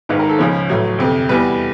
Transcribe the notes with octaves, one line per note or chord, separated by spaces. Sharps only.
G#1 G#2 D#3 B4
A#4
A4
C#2 C#3 F3 G#3 C#5
A1 A2 F#3
G1 F2 C3
E2 B2 G3 B4